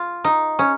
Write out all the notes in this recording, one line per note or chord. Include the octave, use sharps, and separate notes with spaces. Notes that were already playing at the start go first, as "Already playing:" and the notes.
Already playing: F4
D#4
C#4